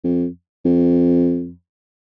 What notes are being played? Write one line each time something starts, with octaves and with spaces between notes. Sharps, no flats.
F2
F2